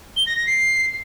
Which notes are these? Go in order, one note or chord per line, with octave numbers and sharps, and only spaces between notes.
G7
A#6
A#6
C7